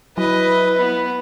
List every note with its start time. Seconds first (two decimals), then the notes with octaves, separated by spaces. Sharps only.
0.18 F#3 E4 B4 D#5
0.78 B3